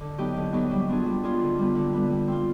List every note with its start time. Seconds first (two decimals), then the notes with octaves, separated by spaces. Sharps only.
0.01 D3
0.18 F#3 B3 D#4 G4
0.36 D3
0.53 F#3 B3 D#4 G4
0.71 G3
0.88 B3 D4 F4 G#4
1.06 G3
1.23 B3 D4 F4 G#4
1.41 D3
1.59 G3 B3
1.75 D3
1.93 G3 B3
2.10 G3
2.28 C4 F4